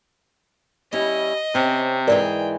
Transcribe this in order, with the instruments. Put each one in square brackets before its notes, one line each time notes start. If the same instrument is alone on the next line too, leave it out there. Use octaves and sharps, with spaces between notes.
[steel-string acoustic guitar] G3 C#4 E4 [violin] D#5
[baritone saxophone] C3 [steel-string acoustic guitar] C4 C#4
[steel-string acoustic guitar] G#2 E3 G#3 [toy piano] A#4 D5 [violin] G5